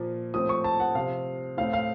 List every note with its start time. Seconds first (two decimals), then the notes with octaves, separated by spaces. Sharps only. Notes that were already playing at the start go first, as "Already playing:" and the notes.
Already playing: A#2 F3 A#3
0.34 A2 F3 A3 C4 D#6
0.49 C#6
0.64 A5
0.80 F#5
0.95 C3 F3 C4 F5
1.57 A2 A3 C4 F5
1.73 F5